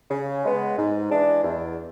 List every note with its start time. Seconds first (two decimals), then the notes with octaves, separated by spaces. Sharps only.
0.11 C#3
0.44 G#3 B3
0.78 G#2
1.11 E3 G#3 D4
1.44 E2